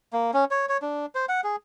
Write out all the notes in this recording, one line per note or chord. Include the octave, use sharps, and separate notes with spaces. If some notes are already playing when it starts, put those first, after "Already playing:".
A#3
C#4
C#5
C#5
D4
C5
F#5
G#4